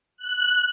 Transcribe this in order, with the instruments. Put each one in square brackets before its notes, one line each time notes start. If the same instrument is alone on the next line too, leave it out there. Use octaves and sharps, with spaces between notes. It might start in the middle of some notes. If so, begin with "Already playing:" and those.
[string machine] F#6